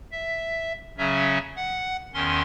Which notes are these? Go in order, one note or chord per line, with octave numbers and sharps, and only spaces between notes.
E5
C#3 F#3 C#4 E5
F#5
E2 D#3 C#4 C6